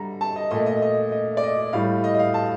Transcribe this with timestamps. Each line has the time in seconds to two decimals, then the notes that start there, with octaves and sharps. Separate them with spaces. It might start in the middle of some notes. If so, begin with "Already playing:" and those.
Already playing: D3 G3 A#5
0.21 A5
0.36 D#5
0.51 A#2 A3 D#5
0.66 D#5
0.82 D#5
1.12 D#5
1.37 D5
1.43 D#5
1.73 A2 G3 F5
2.04 D#5
2.14 D#5
2.19 F5
2.34 A5